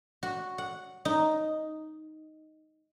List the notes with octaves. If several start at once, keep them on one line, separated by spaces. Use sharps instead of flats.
F#4
F#5
D#4